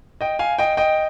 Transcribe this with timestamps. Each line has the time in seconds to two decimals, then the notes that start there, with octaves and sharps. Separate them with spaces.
0.21 D#5 G5
0.39 F5 G#5
0.59 D#5 G5
0.77 D#5 G5